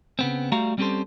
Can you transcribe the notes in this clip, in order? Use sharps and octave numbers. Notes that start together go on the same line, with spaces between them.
C#3 B3 C4
G3 A3 F#4 F5 A#5
G3 C4 C#4 G4 A4 C5